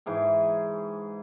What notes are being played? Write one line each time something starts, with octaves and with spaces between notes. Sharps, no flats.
G#2 E3 G#4 G5